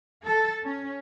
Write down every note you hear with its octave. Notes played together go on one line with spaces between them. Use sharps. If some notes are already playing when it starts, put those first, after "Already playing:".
A4
C#4